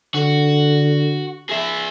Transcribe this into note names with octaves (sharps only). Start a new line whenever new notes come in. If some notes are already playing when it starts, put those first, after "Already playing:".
D3 F#4
G#4 E5